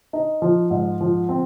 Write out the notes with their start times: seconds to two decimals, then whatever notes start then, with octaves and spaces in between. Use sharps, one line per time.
0.13 D#4
0.42 F3
0.70 G#2
1.01 F3
1.29 C4